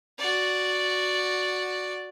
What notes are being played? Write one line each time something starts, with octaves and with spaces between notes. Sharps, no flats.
F#4 D5